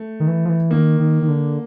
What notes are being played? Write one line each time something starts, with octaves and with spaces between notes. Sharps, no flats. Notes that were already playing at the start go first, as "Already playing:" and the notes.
Already playing: A3
D#3
E3
F3
E3
D#3 A#3
D#3
D#3
D3